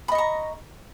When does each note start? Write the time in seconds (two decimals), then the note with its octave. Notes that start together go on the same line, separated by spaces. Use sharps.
0.08 B5
0.12 D#5
0.15 C#6
0.18 A#5